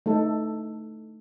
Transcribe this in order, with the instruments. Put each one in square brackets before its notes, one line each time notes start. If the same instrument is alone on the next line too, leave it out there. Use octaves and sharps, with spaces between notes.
[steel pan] A3 D#4 A4